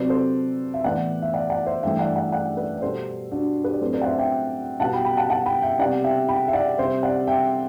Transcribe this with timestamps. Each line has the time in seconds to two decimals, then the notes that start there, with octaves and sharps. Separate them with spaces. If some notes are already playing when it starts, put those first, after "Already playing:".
Already playing: C3 F#3 C4 B4 D5
0.09 A4 C5
0.74 E5
0.84 A2 E3 B3 D5 F#5
1.22 E5
1.33 D5 F#5
1.50 D5 F#5
1.66 C5 E5
1.83 G2 E3 A3 E5 G5
1.99 D5 F#5
2.16 D5 F#5
2.32 D5 F#5
2.57 B4 D5
2.76 D5
2.82 B2 G3 B3 A4 C5
3.31 D4 F#4
3.64 G4 B4
3.74 D5
3.81 A2 F#3 C4 A4 C5
3.93 B4 D5
4.01 F#5
4.06 C5 E5
4.18 E5 G5
4.80 B2 G3 B3 F#5 A5
4.93 G5 B5
5.05 G5 B5
5.17 F#5 A5
5.30 F#5 A5
5.46 G5 B5
5.62 E5 G5
5.79 C3 G3 B3 D5 F#5
6.04 E5 G5
6.28 G5 B5
6.48 E5
6.53 D5 F#5
6.78 C3 G3 C4 C5 E5
7.03 D5 F#5
7.27 E5 G5